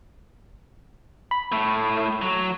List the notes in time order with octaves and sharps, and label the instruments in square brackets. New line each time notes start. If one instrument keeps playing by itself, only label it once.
[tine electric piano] B5
[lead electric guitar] A2 A3
F#3